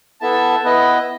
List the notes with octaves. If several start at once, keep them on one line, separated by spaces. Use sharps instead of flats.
B3 E4 A4 E5 A5
B3 E4 B4 D#5